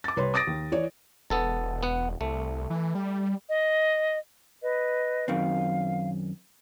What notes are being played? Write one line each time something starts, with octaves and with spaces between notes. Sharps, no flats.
D6 A6
C2 B4 C#5 C6
D6 D#6 A6 A#6 D7
D#2
E3 C#5 D5
E1 B3 A4 A5
B3 F#5
C2 A3
E3
G3
D#5
B4 D#5
F#2 D#3 C4 F5